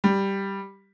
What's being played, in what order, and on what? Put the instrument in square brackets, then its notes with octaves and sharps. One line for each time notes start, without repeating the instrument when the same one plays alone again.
[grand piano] G3